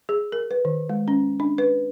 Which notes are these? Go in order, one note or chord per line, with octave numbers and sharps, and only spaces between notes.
G#4
A#4
B4
D#3
G#3
C#4
D4
B4